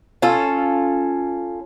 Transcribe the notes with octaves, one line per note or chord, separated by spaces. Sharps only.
C#4 F4 A4